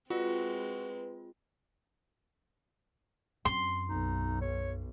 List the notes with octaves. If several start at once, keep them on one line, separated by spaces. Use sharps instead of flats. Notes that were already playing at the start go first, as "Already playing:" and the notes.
G#3 C4 F4 F#4 B4
F#2 C4 C6
B1 D#4
C#5